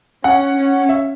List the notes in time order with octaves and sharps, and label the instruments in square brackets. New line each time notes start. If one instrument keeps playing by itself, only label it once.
[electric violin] C#4 [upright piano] F#5
[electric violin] C#4
[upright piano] E5